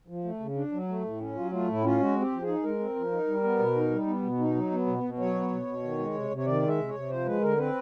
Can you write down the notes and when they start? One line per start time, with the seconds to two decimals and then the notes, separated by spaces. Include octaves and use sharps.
0.08 F3
0.25 A3
0.40 C#3
0.56 D4
0.72 F#3
0.89 A3
1.05 A2
1.20 C#4
1.36 F#3 F4
1.52 A3 F4
1.68 A2 E4
1.84 C#4 F4
2.00 G#3 F#4
2.15 C4
2.21 G4
2.32 F3
2.42 G#4
2.47 D#4
2.63 G#3 A#4
2.79 C4
2.96 F3
3.12 D#4
3.27 G3
3.43 B3
3.59 B2
3.75 D#4
3.91 G3
4.06 B3
4.23 B2
4.39 D#4
4.55 F#3
4.71 B3
4.87 B2
5.03 B2
5.18 F#3 C#5
5.35 B3
5.51 B2
5.66 B2
5.83 D#3
5.99 G#3
6.14 C3
6.31 C3
6.37 C#5
6.46 D#3 D5
6.62 G#3
6.68 E5
6.78 C3
6.88 C#5
6.94 C3
7.10 F3 C5
7.25 G#3 B4
7.42 D3 A#4
7.58 C4 B4